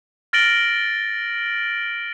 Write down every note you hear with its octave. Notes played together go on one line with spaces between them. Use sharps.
F6 A6 A#6 D7 F#7 G7